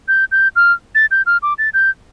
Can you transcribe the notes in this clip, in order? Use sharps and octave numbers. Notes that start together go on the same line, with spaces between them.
G6
G6
F6
A6
G6
F6
D6
A6
G6